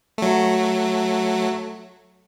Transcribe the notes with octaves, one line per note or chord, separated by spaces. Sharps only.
F#3 A3